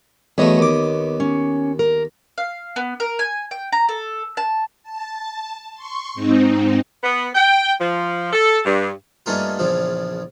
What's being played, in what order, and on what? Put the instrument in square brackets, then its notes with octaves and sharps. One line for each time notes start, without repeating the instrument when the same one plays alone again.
[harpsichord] E2 F#3 A3 [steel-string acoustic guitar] B3 C#5 D#5
[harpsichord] D#2 D6
[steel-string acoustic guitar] C#4
A#4
[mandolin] F5
B3
A#4
G#5
G5
A#5
A4
A5
[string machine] A5
C6 C#6
G#2 C4 D#4
[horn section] B3
G5
F3
A4
G2
[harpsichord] G2 A3 A#3 C#4 D#4 F4
A#1 E2 C#3 F3